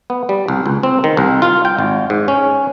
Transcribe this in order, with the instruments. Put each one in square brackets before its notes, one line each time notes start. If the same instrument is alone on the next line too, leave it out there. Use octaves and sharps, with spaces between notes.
[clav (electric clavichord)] B3
G3
C2
C#2
C4
D#3
C2
F4
G5
G#1
G#2
C#4